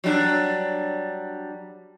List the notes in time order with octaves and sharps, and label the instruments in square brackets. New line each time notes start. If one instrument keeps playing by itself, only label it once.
[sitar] F#3 G3 D4